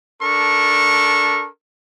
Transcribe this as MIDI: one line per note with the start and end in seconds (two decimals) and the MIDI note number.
0.21 1.48 62
0.21 1.48 69
0.21 1.48 70
0.21 1.48 85